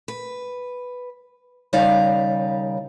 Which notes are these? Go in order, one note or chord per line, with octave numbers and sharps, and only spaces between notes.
B4
D#2 C#3 G3 D#4 D5 F5